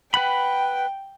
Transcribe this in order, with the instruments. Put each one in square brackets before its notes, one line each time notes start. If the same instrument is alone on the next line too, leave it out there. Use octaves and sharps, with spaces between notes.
[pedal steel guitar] B4 F#5 B5 [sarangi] G5